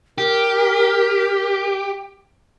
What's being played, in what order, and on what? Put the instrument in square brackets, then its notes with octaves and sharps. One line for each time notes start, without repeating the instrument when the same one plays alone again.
[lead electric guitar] G4 [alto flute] A#4